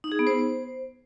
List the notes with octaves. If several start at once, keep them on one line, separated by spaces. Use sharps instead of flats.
D#4
G#4
B3
C5